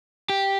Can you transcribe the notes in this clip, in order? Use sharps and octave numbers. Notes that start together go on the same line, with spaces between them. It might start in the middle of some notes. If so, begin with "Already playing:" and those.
G4